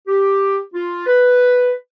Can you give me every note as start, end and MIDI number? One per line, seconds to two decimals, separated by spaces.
0.06 0.56 67
0.73 1.03 65
1.06 1.70 71